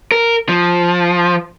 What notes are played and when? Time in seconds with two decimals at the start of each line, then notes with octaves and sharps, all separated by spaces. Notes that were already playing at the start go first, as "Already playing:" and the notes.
0.12 A#4
0.49 F3